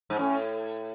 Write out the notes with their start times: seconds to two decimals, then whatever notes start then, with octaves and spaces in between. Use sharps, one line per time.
0.10 G#2
0.19 A2 C#4